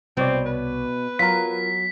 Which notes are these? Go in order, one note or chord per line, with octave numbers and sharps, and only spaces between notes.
C2 B2 C4 C#5 D5
B4
F#3 F4 A#4 B6